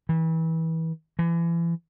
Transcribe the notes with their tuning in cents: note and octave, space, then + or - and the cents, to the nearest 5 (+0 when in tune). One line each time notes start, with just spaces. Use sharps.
E3 -25
E3 +35